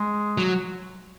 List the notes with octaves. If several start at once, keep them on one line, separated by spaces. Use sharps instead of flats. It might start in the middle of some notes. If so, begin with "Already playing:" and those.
Already playing: G#3
F#3